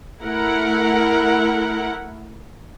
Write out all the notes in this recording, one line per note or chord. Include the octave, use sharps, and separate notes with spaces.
A3 E4 A#4 F#5